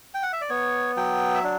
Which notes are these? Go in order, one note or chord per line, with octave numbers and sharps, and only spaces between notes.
G5
F#5
E5
D5
B3 C#5
F#3 G5
E5
D4